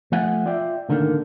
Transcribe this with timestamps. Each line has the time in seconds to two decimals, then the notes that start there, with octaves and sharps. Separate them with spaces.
0.12 F3 A3 F#5 G#5
0.46 F4 D5 E5 G5
0.89 A2 D3 D#3 A3 A#3